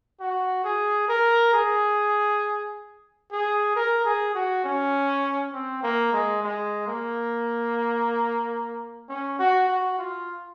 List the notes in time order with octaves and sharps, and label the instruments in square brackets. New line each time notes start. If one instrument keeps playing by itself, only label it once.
[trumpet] F#4
G#4
A#4
G#4
G#4
A#4
G#4
F#4
C#4
C4
A#3
G#3
G#3
A#3
C#4
F#4
F#4
F4